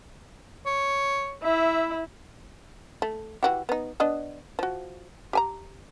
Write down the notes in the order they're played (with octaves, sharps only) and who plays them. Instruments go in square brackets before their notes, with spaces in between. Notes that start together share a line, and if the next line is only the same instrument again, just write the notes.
[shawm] C#5
[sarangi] E4 [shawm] E5
[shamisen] A3
E3 F#4 G4
B3 D#4
B3 D4 D#5
F3 F#4
G4 G#5 A#5